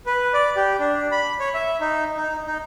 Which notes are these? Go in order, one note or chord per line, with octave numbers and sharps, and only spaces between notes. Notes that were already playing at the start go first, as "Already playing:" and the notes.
B4
D5
G4
D4
B5
C#5
E5
D#4
D#4
D#4